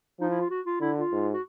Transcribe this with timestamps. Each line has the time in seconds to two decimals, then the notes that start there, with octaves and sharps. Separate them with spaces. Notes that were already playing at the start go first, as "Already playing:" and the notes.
0.20 F3 D#4
0.30 E4
0.40 F4
0.50 F#4
0.66 F4
0.81 D3 E4
0.96 F4
1.12 G#2
1.33 F#4